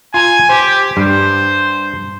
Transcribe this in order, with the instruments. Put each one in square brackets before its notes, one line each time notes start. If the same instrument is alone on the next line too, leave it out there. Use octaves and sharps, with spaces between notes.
[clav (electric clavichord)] F4 A#5 [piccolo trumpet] G#5
[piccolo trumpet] G4 [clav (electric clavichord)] C5
[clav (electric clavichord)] G2 G3 [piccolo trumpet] C5